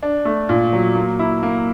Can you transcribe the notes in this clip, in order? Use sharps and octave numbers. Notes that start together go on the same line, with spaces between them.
D4
A3
A#2
F#3
A#3
E4
A#3